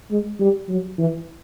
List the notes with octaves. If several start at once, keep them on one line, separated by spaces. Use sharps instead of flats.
G#3
G3
F#3
E3